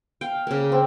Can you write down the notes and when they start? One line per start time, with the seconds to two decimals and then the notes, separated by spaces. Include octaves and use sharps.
0.21 F5 G5
0.47 C#3 A#3
0.72 C4